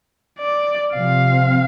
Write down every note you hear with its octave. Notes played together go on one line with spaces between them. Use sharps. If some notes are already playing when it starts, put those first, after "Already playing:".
D5
C3 F3 C4 F5